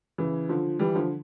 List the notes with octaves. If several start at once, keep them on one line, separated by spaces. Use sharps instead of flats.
C#3 E3
D3 F3
E3 G3
D3 F3